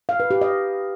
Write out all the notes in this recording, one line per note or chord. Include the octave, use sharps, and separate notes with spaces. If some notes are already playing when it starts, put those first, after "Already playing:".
F5
B4
G4
D#5